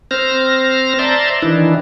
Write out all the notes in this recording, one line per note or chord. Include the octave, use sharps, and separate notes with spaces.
C4 C5 F6 A#6
C5 D5 E5 A5 A#5 C6
D#3 E3 D4 E4